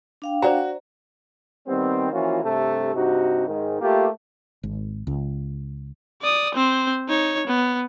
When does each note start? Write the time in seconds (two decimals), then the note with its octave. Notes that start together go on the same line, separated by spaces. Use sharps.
0.22 D4 F5 G5
0.42 F#4 C5 D5 A#5
1.68 D#3 G3 B3 C4
2.12 E3 F3 A#3 C#4 F4 F#4
2.44 G2 C3 A3 A4
2.95 G2 C3 D#4 F#4
3.48 G#2 D#3
3.81 A3 A#3 F4 G4
4.63 G#1
5.07 C#2
6.22 D5 D#6
6.55 C4 C5
7.08 D#4 C#5
7.47 B3